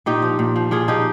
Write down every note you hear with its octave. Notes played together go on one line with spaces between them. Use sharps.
A#2 D#4 G4
F3
A#2
F3
A#2 F4 G#4
F3 D#4 G4